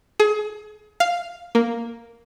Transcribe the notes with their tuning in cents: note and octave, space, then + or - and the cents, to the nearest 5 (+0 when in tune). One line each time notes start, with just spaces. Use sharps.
G#4 +30
F5 +0
A#3 +0